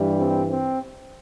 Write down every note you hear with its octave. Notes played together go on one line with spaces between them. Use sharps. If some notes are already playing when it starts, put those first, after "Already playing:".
Already playing: G2 E3 G3
C4
C4